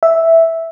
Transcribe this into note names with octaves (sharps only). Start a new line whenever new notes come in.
E5